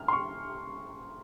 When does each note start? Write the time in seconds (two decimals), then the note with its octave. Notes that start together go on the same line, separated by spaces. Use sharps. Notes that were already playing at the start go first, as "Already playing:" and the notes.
Already playing: F6
0.08 C6
0.13 C#6